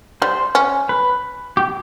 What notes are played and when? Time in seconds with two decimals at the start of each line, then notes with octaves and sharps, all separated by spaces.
0.22 G3 C5
0.55 C#4
0.89 B4
1.57 G4